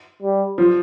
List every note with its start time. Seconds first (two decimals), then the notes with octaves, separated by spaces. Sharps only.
0.22 G3
0.58 F3